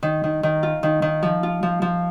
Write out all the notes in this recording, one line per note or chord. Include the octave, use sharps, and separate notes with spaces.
D#3
D#3
D#3
F4
D#3
D#3
F3
F4
F3
F3